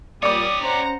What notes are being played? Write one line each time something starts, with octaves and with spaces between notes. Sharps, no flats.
A#2 G3 G4 C#5 D5 D6 D#6
C#4 C5 F#5 A#5